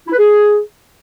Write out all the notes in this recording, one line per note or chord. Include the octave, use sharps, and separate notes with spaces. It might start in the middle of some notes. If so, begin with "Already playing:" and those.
E4
B4
G#4